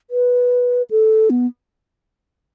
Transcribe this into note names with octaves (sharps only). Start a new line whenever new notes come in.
B4
A4
B3